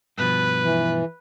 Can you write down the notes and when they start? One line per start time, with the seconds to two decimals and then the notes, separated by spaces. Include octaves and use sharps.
0.18 G2 B2 F3 B4
0.62 E3